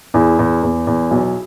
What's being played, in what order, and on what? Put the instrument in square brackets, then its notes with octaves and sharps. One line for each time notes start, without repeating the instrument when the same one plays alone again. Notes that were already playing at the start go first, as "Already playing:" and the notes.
[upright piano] E2 E4 G#4
E2
E2
E2
B1